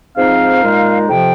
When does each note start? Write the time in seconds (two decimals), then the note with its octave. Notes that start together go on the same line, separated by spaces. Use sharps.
0.17 G#2 F3 C4 D#4 F5
0.62 A#2 G#3 D#4
1.08 F2 C3 F3 G5